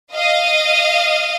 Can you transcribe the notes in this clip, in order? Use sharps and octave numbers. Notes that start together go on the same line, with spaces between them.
D#5 F5